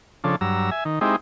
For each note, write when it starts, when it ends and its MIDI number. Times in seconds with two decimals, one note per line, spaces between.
0.24 0.36 49
0.24 0.36 53
0.24 0.36 62
0.24 0.36 69
0.41 0.70 43
0.41 0.70 54
0.41 0.70 82
0.41 0.70 88
0.71 0.84 76
0.71 0.84 80
0.85 0.99 51
1.01 1.16 56
1.01 1.16 60
1.01 1.16 63
1.01 1.16 64
1.01 1.16 67